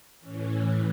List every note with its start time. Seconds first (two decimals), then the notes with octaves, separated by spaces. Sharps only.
0.20 A2 E3 C#4